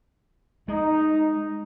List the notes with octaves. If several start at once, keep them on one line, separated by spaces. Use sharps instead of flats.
G#3 D#4